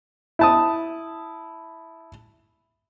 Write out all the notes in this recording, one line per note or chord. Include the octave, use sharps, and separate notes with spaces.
E4 A5 D#6